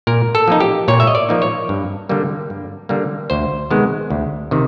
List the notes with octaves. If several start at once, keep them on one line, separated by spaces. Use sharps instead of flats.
A#2 A#4
A4
F3 A#3 D#4
G4
A#2 C#5
E5
D#5
D5
F3 A#3 D#4
C#5
G2
D3 G3 A#3
G2
D3 G3 A#3
D2 C5
C3 D#3 G#3 B3
D2
C3 D#3